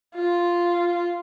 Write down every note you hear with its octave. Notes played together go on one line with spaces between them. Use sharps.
F4